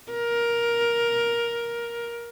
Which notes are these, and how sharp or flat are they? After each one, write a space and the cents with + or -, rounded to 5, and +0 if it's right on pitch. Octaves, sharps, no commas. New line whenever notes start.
A#4 +10